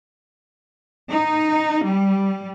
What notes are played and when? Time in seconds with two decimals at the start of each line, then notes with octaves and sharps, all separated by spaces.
1.10 D#4
1.84 G3